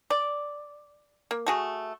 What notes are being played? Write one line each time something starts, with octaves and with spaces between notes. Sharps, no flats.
D5
A#3
A3 F#4 G#4